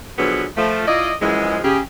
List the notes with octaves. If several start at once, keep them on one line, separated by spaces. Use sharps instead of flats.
B2 D3 F3 F#3 B3 G#4
F3 A3
E4 F4 D5 D#5
F#2 E3 F3 G#3
C#3 G4 G#4